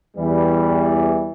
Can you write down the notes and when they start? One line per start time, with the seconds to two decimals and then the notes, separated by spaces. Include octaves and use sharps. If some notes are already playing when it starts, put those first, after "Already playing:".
0.17 E2 E3 G3